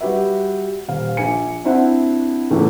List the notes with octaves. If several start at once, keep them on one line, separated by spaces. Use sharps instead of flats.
G3 F#4 G4 B4 E5
D#1 F5
A#1 G#5 C#7
C4 D4 E4 C5 E5 F#5
C#2 A2 E3 A3 B3